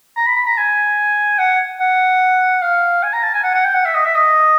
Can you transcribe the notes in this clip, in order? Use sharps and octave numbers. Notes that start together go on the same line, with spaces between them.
A#5
B5
B5
A#5
G#5
F#5
F#5
F5
G#5
A#5
A5
G#5
F#5
F#5
G5
F#5
E5
D#5
E5
D#5